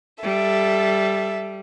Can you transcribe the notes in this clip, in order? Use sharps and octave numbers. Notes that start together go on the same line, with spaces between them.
G3 A4 E5